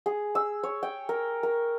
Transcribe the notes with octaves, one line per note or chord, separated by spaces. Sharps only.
G#4
E6
C#5
G5
A#4
A#4